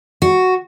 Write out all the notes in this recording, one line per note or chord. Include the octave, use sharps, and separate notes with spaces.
F#4